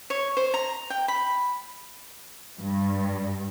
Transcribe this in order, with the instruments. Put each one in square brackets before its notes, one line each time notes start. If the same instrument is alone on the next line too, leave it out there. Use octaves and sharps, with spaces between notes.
[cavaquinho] C#5
C5
A#5
G5
B5
[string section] G2